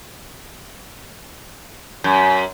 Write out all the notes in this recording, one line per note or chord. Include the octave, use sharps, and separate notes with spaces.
F#2